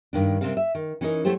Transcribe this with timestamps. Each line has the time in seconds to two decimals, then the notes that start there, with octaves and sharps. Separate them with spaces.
0.13 G2 D#3 D4
0.41 C3 G3 C4 A#4 F5
0.57 E5
0.75 D#3
1.01 E3 C#4 D#4 A#4 D#5
1.25 F#3 A3 E4 G4 C5